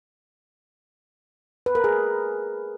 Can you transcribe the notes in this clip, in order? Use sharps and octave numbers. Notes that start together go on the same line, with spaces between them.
B4
A#4
G#4